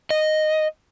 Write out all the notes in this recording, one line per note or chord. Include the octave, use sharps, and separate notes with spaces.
D#5